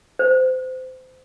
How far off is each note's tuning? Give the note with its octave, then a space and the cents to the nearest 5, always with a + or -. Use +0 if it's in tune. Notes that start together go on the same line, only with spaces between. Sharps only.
C5 -25